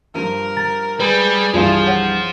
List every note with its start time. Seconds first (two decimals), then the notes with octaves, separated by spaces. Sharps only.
0.15 G2 F3 A#4 D#7
0.57 A#5 A6
1.00 G3 G#4 B4 B5
1.54 C2 G2 E3 F3 F4 D5 F5
1.87 C#5 F#5